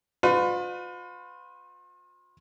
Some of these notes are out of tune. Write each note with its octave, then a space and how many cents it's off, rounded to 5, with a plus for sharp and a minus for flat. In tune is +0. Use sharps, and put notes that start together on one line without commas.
F4 +40 B4 +35 D5 +40